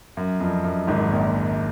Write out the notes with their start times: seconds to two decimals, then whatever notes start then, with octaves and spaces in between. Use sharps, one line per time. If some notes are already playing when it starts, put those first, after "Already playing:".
0.17 F#2
0.40 F2
0.64 F#2
0.87 G#1 G#2
1.11 A#1 A#2